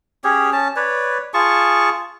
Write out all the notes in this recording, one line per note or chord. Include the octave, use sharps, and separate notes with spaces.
C#4 G4 G#4 C#5
C#4 A5
B4 C#5 D5
F4 G#4 A5 C#6